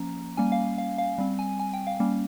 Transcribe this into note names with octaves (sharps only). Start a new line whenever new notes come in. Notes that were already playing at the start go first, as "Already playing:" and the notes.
Already playing: F3 A#3 C#4 A#5
G3 A#3 C#4 G#5
F5
F5
F5
G3 C4
G#5
G#5
G5
F5
G3 A#3 C#4